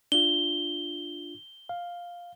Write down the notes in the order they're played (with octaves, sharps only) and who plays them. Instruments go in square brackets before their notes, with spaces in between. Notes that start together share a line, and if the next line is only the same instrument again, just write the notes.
[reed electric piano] D4 F4 [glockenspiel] G7
[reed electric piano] F5